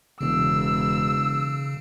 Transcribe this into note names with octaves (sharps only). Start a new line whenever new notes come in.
E1 C#3 E6